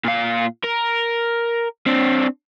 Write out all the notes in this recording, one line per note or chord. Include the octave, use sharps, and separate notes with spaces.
A#2 F5
A#4
C4 D4